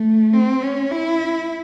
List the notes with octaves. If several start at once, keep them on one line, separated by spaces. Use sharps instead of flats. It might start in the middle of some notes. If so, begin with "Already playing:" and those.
Already playing: A3
C4
C#4
E4